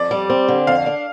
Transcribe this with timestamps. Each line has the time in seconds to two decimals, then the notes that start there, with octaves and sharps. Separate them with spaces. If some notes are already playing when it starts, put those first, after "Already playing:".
Already playing: F2 D5
0.11 G3
0.30 C4
0.48 D3
0.67 F2 F5
0.86 D4